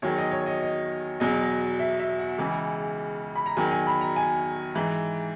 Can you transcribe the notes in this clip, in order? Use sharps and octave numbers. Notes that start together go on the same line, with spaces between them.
E2 D#3 F#3 C#5
D#5
C#5
D#5
D#5
E2 B2 F#3 D#5
E5
E5
F#5
C#2 C#3 E3
B5
A#5
E2 D#3 F#3 G#5
G#5
B5
A#5
G#5
G#2 E3